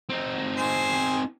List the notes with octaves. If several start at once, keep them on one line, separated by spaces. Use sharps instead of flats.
C4 D#4
G#4 C5